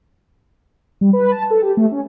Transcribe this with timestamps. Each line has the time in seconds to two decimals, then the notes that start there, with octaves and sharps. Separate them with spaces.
1.01 G3
1.13 B4
1.32 A5
1.51 A4
1.62 G4
1.77 A3
1.91 C#4